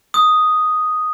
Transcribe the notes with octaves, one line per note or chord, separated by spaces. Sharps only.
D#6